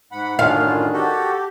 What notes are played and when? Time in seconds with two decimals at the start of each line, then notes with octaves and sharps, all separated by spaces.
0.12 G#2 F#5 B5
0.39 F#2 A2 D3 D#3 C#4 D4 F4 F5
0.94 F#4 G4 A4